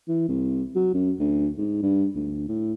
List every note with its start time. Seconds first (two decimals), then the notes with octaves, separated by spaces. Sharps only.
0.08 E3
0.29 C2
0.75 F#3
0.94 F#2
1.19 D2
1.58 G#2
1.82 G2
2.15 D2
2.48 A2